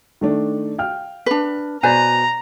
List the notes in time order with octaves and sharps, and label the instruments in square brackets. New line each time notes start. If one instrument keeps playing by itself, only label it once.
[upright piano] D#3 A3 D4
F5 G5 F6
[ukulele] D4 B4
[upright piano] B2 D5 A6 [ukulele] B4 C5 G#5 [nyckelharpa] A#5